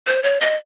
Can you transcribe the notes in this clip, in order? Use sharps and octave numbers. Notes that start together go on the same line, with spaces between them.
C5
C#5
D#5